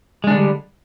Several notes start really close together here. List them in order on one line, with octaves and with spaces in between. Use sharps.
G#3 D4 D3 G3